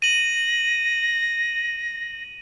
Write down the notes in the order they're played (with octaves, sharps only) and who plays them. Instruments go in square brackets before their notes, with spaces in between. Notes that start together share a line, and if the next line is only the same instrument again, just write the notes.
[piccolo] A#6 [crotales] D#7 F#7